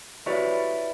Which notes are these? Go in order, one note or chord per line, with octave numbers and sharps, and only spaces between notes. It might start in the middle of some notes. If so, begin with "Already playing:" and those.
E4 F#4 G4 B4 C#5 D5